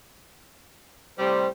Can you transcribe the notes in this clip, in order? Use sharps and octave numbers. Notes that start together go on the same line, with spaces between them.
A2 C3 G3 C5